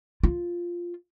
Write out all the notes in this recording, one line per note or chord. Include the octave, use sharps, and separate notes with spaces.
F4